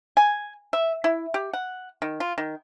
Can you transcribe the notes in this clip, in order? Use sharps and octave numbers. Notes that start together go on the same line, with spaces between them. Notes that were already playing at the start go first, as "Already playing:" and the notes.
G#5
E5
E4
G4
F#5
D#3
F4
D#3